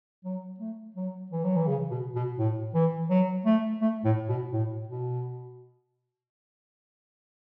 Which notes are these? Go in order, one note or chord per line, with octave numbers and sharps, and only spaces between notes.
F#3
A3
F#3
E3
F#3
E3
C#3
B2
B2
A2
E3
F#3
A3
A3
A2
B2
A2
B2